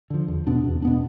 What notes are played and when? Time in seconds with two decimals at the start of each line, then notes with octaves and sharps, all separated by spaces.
0.10 D3 F3
0.28 E2
0.47 B2 B3 D4
0.65 E2
0.82 B2 B3 D4